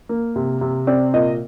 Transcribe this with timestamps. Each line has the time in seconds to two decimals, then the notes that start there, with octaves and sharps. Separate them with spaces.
0.09 A#3
0.36 C3
0.61 C3
0.87 C4 D5
1.14 A#2 D#5